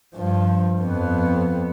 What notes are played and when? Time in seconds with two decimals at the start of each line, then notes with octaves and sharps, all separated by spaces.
0.15 G2 F3
0.80 F2 B3